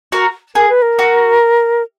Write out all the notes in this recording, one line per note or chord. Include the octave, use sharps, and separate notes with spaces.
F#4 A#4
G#4 A#4
B4
A#4
F#4